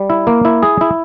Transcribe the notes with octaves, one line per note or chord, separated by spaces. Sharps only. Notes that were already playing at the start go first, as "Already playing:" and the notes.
Already playing: G3
E4
A#3
E4
G#4
E4